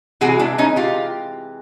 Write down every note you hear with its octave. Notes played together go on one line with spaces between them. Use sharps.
C3 E3 G#3 F#4 G#4
D4 E4
C#4 D#4
F4 G4